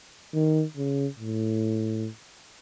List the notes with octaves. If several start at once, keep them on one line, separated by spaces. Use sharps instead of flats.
D#3
C#3
A2